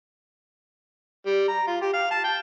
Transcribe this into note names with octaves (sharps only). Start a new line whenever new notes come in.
G3
A#5
F4
G4
F5
A5
G5